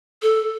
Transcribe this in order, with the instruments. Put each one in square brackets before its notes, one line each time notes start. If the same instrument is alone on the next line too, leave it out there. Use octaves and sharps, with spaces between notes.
[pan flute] A4